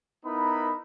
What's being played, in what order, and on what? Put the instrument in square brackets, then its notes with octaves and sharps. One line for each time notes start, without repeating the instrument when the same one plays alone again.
[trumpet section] B3 D#4 E4 A#4 B5